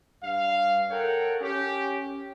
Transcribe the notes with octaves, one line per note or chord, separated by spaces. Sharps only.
G2 F5
A4 A#4 C#5 F#5 G5
C#4 G4